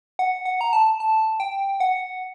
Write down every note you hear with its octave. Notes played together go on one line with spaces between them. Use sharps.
F#5
F#5
A#5
A5
A5
G5
F#5